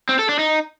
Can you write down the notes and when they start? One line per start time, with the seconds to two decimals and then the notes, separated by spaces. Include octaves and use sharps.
0.09 C4
0.19 A4
0.29 D4
0.39 D#4